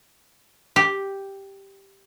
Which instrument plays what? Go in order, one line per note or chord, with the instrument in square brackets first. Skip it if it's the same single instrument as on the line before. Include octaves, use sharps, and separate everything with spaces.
[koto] G4